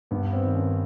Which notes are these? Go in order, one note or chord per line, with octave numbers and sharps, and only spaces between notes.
G2 B3
C4
D#3
C#4